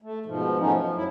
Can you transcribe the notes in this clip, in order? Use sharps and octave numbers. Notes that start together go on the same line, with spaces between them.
A3
G#2 B2 F3
F3 F#3 A3 B3 C#4 D#4
F3
F#2 F#3 E4